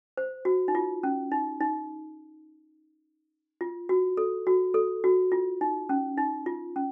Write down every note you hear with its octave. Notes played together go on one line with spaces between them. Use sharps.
C5
F#4
D#4
F4
C#4
D#4
D#4
F4
F#4
A4
F#4
A4
F#4
F4
D#4
C#4
D#4
F4
C#4